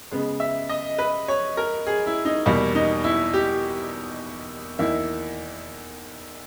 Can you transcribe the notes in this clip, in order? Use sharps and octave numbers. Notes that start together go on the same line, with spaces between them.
C#3 G#3 B3
E5
D#5
B4
C#5
A#4
G#4
E4
D#4
E2 B2 G3 A#3
D#4
E4
G4
E2 D#3 A#3 E4